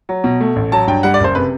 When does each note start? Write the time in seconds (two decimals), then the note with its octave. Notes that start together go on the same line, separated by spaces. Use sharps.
0.09 F#3
0.24 B2
0.41 A3
0.56 A1
0.72 F#3 A5
0.87 G2 G5
1.03 G3 F#5
1.14 D5
1.20 F#1 C5
1.35 C3 B4